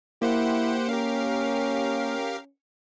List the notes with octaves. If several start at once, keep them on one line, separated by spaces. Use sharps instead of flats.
A#3 E4 G4 C5 F#5
C#4 G4 A#4 F5